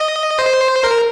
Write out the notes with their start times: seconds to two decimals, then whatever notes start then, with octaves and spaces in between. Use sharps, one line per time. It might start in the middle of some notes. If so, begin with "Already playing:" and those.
Already playing: D#5
0.39 C5
0.84 A#4